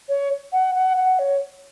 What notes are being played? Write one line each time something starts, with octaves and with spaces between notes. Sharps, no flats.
C#5
F#5
F#5
F#5
C#5